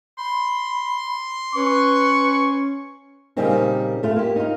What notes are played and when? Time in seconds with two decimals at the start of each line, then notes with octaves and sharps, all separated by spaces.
0.18 B5 C6
1.55 C#4 B4 C#6
3.37 A#2 C#3 G3 A#3 C4 D#4
4.03 A3 F4
4.16 A#3 G4
4.36 D#4 F4